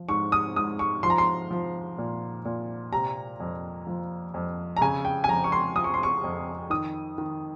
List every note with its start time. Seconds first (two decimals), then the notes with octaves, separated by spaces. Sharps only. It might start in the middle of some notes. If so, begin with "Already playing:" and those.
Already playing: F3
0.09 G#2 C#6
0.32 D#6
0.56 G#2 D#6
0.79 C#6
1.03 F3 C6
1.10 A#5
1.18 C6
1.51 F3
1.98 A#2
2.45 A#2
2.92 C3 A#5
3.40 F2
3.87 F3
4.34 F2
4.77 A#5
4.81 C#3 G#5
5.05 G5
5.24 G#5
5.28 F2 A#5
5.44 C#6
5.52 C6
5.75 F3 D#6
5.84 C#6
5.94 C6
6.03 C#6
6.24 F2
6.70 D#3 D#6
7.18 D#3